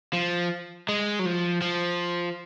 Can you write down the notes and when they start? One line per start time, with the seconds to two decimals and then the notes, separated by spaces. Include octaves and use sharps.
0.13 F3
0.89 G#3
1.19 F#3
1.26 F3
1.62 F3